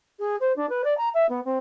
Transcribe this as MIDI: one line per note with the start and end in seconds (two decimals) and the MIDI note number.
0.19 0.36 68
0.40 0.53 72
0.56 0.69 62
0.69 0.82 71
0.84 0.97 74
0.98 1.09 82
1.14 1.26 76
1.29 1.41 59
1.45 1.58 60